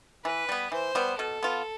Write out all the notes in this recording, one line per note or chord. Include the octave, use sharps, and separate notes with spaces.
E3 B4
G3 B3
E3 C5
G3 B3
B2 A4
B3 F4